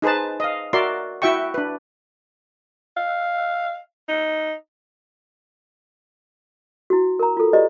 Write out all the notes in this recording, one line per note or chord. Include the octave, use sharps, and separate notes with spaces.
D#4 G#4 B4 C5 A5
D#5 F5
F#4 A#4 D5 E5 C6
E4 F#4 E5 G5 C#6
D4 B4
F5
D#4
E4 F#4
A#4 A#5
F4 A4
G4 B4 D5 D#5